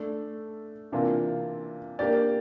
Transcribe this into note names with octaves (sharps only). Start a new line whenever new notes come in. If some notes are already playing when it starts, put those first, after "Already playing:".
Already playing: A3 D4 A4 D5
C3 E3 A#3 D4 F4
A#3 D4 G4 D5